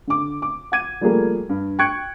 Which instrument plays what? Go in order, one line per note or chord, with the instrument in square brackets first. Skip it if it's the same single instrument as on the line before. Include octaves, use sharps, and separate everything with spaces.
[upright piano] D3 D6
D6
F#5 D6 G#6 D#7
F3 G3 A3 A#3 G#4 A#4
G2
G5 C#6 F#6 G#6 C#7 D7